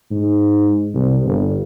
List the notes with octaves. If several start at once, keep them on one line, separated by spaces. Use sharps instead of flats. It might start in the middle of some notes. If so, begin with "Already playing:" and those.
G#2
C2
G1